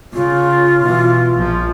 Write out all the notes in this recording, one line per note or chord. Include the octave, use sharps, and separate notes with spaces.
C#3 F4
B2 E3
A#1 F3